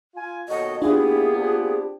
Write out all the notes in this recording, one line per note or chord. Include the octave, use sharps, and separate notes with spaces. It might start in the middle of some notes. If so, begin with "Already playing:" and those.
F4 G#5
D#2 B2 F#3 F#4 A4 C#5 D#5
A#3 B3 D4 E4 F4 G4 G#4
C4 D4 F4 G4